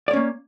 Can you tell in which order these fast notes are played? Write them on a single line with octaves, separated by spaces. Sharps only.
D5 C#5 C#4 A#3